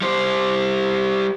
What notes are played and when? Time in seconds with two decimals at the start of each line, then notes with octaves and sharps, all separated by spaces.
0.01 G3 C5